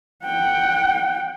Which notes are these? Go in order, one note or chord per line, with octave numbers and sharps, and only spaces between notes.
F#5 G5